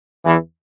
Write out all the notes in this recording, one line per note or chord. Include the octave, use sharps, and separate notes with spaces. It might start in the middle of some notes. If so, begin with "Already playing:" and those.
E2 E3